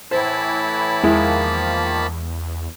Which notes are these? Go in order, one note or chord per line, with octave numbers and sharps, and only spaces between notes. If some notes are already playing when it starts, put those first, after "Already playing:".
A2 E3 E4 C5 A5 B5
E2 D#3 F3 G#3 A#3 E4